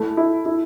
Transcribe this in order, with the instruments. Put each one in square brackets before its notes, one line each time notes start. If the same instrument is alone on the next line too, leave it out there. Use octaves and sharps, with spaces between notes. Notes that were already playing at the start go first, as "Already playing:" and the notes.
Already playing: [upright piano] A3 [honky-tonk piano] E4
[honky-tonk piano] E4
E4